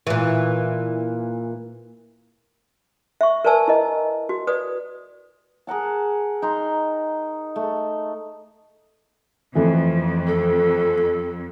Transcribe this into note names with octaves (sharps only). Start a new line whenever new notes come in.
A#2 E3
E5 C#6
A#4 B4 D5 G#5 A5 E6
E4 A#4 D#5
F#4
B4 D5 D#6
G#4 A#4 F#5 A5
D#4 A#5 C6
A3
F2 E3 A3
A4